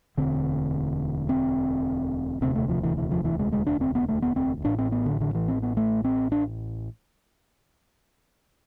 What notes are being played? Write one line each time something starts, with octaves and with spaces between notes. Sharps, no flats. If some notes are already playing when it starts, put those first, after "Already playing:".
E1 D2 D3 C4
C4
E1 D2 C3 C4
A3
F3
E3
E3
F3
E3
G#3
G#3
D4
C4
B3
A3
B3
C4
A1 A2 D4
C4
B3
D3
D3
E3
C4
B3
A3
C4
D4